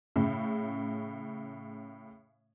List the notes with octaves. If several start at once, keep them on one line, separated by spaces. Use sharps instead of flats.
A2 C#3